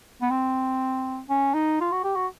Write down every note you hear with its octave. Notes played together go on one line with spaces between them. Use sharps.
B3
C4
C#4
D#4
F4
F#4
G4
F#4